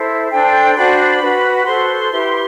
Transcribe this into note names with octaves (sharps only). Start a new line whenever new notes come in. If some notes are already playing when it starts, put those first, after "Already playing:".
Already playing: E4 A4 C5
D4 A4 C5 G5
D4 F#4 C5 B5
F#4 B4
F#4 A4 C5 C6
E4 G4 B4